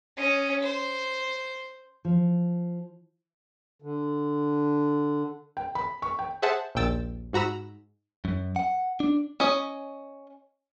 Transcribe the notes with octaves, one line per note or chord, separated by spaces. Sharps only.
C#4 D#5
C5
F3
D3
G5
B5
C#6
G5
G#4 C5 E5 F#5 A5
A#1 D#2 A#2 G5 E6 A6
G#2 F#4 A#5 B5 E6
F#2
F#5
D4
C#4 D#5